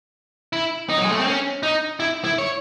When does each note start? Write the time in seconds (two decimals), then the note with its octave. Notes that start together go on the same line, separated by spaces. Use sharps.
0.53 E4
0.89 D#4
0.98 F#3
1.05 G#3
1.12 A3
1.20 C4
1.27 C#4
1.63 D#4
2.00 E4
2.24 E4
2.39 C#5